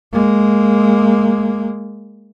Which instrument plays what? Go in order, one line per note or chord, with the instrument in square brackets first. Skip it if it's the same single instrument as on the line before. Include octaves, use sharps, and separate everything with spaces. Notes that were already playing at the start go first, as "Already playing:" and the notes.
[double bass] G#3 A#3